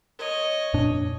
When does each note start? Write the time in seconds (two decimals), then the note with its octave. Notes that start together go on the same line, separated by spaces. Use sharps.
0.19 C#5 D#5
0.74 F2 A#2 D4